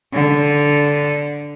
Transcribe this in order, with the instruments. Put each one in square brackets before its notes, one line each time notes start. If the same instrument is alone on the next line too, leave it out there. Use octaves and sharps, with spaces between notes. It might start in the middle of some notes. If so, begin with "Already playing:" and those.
[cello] D3